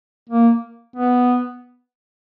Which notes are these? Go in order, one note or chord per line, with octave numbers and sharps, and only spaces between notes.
A#3
B3